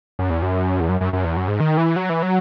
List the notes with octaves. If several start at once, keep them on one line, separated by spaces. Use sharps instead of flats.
F#2
E2
F#2
E2
F#2
F#2
F#2
E2
F#2
G#2
D#3
E3
F#3
E3
F#3